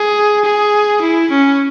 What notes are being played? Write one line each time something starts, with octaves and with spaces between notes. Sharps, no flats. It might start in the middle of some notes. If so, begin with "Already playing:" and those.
Already playing: G#4
G#4
E4
C#4